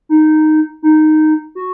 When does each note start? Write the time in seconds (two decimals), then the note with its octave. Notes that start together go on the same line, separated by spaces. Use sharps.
0.09 D#4
0.83 D#4
1.55 F#4